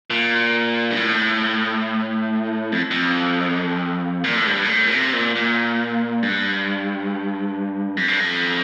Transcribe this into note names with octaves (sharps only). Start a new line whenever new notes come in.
A#2
G2
A2
F2
F2
A#2
A2
G2
A#2
A2
A#2
C3
A#2
A#2
G2
F2
G2
F2